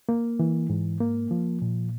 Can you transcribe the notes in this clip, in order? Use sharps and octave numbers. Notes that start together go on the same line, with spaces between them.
A#3
E3
G#2
A#3
F3
A#2